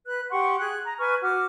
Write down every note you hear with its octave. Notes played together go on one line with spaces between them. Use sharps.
B4 F#6
G4 F#5 C6 C#6
G#4 F#6
A#5
B4 G#5 C#6 F6
F#4 D6 F6